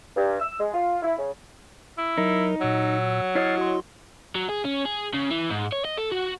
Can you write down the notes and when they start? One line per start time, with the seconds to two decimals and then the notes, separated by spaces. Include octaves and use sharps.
0.16 G2
0.40 E6
0.59 G#3
0.74 F4
1.03 E4
1.18 C#3
1.98 E4
2.18 F#3 D#4 A#4
2.61 A#2 F#3 E6
3.35 E4 C#5 D#5 F6 A6 C7
3.58 F#4 C6
4.35 F#3
4.49 G#4
4.65 C#4
4.86 G#4
5.14 C#3
5.31 E3
5.50 G#2
5.73 C#5
5.85 D#5
5.98 A4
6.12 F#4